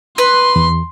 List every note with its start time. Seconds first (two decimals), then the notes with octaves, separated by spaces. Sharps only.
0.18 B4 C6
0.56 E2